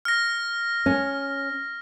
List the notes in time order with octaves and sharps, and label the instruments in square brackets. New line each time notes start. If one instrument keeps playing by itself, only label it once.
[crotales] F6 A#6
[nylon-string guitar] C#4